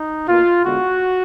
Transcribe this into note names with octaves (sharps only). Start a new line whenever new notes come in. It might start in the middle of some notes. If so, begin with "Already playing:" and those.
Already playing: D#4
B2 A#3 F4
D3 G#3 B3 F#4